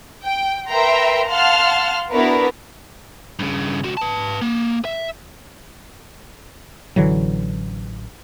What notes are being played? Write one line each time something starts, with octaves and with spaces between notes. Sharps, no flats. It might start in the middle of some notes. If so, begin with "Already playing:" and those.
G5
A#4 B4 E5 G5 A#5 C6
F5 F#5 A5 C6 F6
B3 D4 E4 F#4 A#4 B4
G2 C#3
C#2 F#4
B4 A5
A#3
E5
A1 D3 E3 F#3